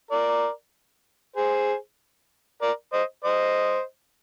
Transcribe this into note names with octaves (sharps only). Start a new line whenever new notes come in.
A#4 D5
G#4 C5
A#4 D5
C5 D#5
C5 D#5